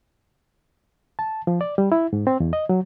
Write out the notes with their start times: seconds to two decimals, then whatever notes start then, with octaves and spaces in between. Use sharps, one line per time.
1.19 A5
1.47 F3
1.61 D5
1.78 G3
1.92 E4
2.13 G#2
2.27 C4
2.40 E2
2.53 D#5
2.69 F#3